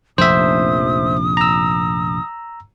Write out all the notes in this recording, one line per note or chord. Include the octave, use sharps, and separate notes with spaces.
F1 A#1 C5 E5 D#6
A#5 E6